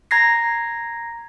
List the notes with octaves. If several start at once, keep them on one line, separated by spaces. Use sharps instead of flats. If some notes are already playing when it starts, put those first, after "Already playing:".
A#5 G#6 A#6 C7